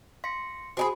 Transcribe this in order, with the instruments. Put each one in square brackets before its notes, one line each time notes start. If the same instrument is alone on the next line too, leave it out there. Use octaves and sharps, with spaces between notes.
[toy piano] F5 [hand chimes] C6 A#6 C#7
[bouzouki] C4 D#4 G#4 [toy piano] F#4 G#5 B5